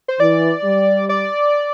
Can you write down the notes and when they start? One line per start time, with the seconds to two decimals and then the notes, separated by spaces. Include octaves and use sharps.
0.08 C5
0.20 E3 D5
0.64 G3
1.09 D5